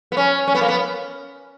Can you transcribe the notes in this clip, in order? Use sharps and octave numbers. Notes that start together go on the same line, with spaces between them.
B3
C#4
C#4
B3
A#3
B3